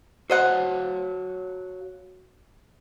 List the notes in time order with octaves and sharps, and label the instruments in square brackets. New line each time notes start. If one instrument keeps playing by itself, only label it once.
[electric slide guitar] F#4 C#5 F5 [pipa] C5 D#5 F#5